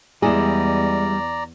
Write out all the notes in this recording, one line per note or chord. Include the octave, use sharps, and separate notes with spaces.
E2 G3 G#3 E4 G#4 D5 A#5